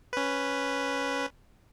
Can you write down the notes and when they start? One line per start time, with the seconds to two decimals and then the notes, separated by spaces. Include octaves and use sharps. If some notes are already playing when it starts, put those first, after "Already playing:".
0.13 C#4 B4